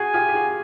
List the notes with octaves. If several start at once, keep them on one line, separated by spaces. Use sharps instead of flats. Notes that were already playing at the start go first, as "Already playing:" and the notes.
Already playing: F#4 G#4 G#5
F4 G4
G4
F#4 G#4